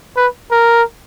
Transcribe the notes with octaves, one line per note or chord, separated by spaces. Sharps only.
B4
A#4